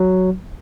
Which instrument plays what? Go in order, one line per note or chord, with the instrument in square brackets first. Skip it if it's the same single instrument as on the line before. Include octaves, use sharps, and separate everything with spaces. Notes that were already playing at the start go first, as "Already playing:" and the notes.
Already playing: [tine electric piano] F#3